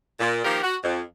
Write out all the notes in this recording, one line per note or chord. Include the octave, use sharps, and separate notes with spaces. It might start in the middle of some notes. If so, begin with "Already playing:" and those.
A#2
D#3 F3 A#3 G4 A#4
F#4
F2